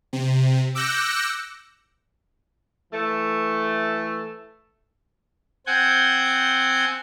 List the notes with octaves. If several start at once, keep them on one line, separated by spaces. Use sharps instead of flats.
C3
D6 E6 F#6 G6 A#6 C#7
E3 A3
C4 F#5 G#5 G6